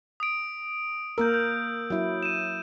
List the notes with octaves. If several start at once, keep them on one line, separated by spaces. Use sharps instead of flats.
D#6 D7
A#3 A#4 E6 G6
G6
F#3 E4
D#7 E7